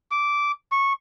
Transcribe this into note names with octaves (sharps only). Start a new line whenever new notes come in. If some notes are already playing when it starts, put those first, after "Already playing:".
D6
C#6